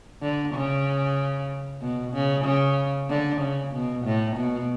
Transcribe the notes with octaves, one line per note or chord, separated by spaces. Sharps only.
D3
C#3
B2
C#3
C#3
D3
C#3
B2
A2
B2